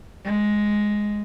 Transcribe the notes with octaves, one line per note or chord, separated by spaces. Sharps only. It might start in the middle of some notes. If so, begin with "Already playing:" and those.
G#3